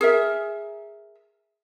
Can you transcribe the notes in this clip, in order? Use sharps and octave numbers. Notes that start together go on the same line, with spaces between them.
G#4 A#4 E5